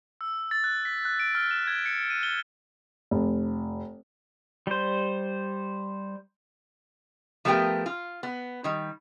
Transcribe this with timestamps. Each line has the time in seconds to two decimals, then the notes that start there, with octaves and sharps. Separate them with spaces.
0.21 E6
0.51 A6
0.64 F#6
0.85 B6
1.05 F#6
1.20 D7
1.35 F6
1.51 E7
1.67 G#6
1.86 C#7
2.10 D#7
2.23 G7
3.11 F1
4.67 G3 C5
7.45 F3 A3 B3 G4 A#4 G5
7.86 F4
8.23 B3
8.64 D#3 G3